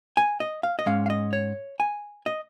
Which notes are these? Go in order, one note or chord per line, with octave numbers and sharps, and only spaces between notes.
G#5
D#5
F5
D#5
G#2 G#3 C#4 F5
F5
D#5
C#5
G#5
D#5